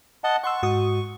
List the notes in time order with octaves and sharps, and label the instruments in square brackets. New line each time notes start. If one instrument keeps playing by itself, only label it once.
[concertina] D#5 F#5 A5
[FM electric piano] F#5 C6 E6 [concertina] C#6
[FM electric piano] G#2 F#4 D#6